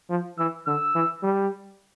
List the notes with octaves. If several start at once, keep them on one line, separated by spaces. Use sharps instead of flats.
F3
E3 E6
D3 E6
E3
G3